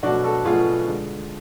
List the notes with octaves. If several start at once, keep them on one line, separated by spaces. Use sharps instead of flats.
B2 F#3 A3 D4 F#4
F#4 A4
B2 F#3 A3 F4 G#4
D3 G#3